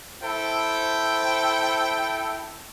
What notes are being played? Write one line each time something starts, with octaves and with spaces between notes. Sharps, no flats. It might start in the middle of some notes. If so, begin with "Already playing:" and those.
E4 A4 C5 G5